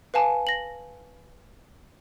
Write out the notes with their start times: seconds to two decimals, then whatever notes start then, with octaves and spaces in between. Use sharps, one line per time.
0.14 B4 F5 G#5 A5
0.47 A#6 F#7